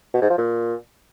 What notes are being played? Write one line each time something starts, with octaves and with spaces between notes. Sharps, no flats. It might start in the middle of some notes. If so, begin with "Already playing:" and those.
B2
G#2
F3
A#2